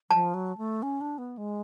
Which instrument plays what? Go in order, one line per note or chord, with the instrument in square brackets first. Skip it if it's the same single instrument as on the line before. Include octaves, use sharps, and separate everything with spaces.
[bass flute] F3 [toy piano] A5
[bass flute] F#3
A3
C#4
D4
B3
G#3